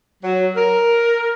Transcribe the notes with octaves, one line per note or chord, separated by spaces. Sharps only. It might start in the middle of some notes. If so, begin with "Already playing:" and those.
F#3
A#4